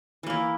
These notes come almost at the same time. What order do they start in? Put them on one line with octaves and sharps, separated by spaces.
E3 A#3 E4